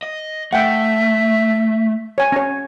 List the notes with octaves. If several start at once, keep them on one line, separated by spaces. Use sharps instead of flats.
D#5
A3 E5 F#5 G5
C#5 G#5
C#4 C#5